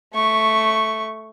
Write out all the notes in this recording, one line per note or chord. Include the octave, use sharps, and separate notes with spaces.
A3 C#6